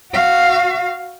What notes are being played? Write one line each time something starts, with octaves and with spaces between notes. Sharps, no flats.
F#4 F5